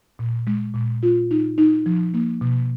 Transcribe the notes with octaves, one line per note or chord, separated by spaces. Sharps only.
A#2
G#3
A#2
F4
D#4
D#4
F3
A#3
B2